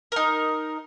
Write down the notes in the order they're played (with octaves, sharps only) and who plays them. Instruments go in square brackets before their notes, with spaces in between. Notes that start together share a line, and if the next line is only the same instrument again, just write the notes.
[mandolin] D#4 A#4